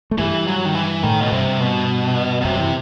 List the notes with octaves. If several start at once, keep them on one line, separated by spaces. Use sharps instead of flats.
A3
G2 E3 G3
F#3
D#3
E3
A2 D#3 A3
B2
G2 C3 G3
B2
B2
F#2 C3 F#3
E3